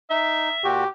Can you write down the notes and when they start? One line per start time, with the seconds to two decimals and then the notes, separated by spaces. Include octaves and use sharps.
0.10 D#4 E5
0.64 A#2 F#4 G4